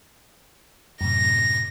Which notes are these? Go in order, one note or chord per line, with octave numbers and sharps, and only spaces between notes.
F#2 A2 C3 A#6